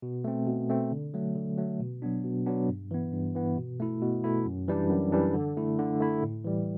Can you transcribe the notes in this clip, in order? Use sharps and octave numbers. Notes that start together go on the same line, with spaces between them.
B2
A3 C4
B2
A3 C4
D3
F#3 A3
D3
F#3 A3
B2
F#3 B3 D4
B2
F#3 B3 D4
G2
E3 B3
G2
E3 B3
B2
A3 E4
B2
A3 E4
F#2
E3 G3 D4
F#2
E3 G3 D4
D3
A3 E4
D3
A3 E4
A2
E3 G3